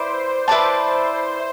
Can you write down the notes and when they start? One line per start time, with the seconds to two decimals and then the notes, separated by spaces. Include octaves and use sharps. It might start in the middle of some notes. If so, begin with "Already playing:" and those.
Already playing: E4 B4 C5 D5
0.48 E4 B4 D5 A5